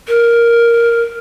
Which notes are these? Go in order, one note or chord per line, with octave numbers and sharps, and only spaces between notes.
A#4